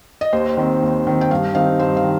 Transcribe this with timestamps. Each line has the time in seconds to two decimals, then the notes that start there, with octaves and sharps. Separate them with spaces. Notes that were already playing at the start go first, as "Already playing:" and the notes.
0.21 D#5
0.33 D#2 C5
0.57 D#3 C4
0.82 D#2
1.07 D#3 C4
1.21 G5
1.31 G2 F5
1.55 D#3 C4 D#4 F5
1.79 G2 C5
1.97 F5
2.04 D#3